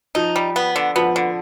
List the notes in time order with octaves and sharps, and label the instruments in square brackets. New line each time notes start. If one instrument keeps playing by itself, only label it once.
[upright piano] F3 [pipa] D#4
[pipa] G3
B3
D3
[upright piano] F3 [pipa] B3
[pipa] D3